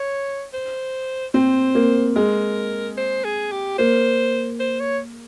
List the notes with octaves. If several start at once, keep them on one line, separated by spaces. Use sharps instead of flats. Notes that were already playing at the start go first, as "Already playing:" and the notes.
Already playing: C#5
C5
C4 C5
A#3
G#3 A#4
C5
G#4
G4
A#3 C5
C5
C#5